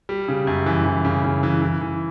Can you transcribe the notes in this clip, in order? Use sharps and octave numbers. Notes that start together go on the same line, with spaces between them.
G3
C#3
F#2
E3
E3
C#3
C#3
E3
E3
E3